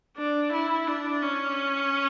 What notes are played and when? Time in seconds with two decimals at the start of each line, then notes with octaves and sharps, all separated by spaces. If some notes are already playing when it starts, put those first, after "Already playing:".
0.17 D4
0.52 E4
0.87 D4
1.22 C#4